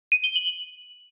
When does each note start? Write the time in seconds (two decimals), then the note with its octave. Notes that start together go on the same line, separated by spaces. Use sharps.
0.12 D#7
0.24 G7
0.36 F#7